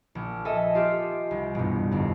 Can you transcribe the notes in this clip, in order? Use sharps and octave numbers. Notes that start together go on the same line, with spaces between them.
A#1
A4 D#5 E5 G#5
F4 G4
C2
E1 G2
G1 F2